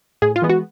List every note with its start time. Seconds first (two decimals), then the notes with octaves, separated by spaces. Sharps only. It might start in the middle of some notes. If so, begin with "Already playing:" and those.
0.22 A2 G#4
0.36 F4
0.42 E3 G#3 B3
0.49 F#4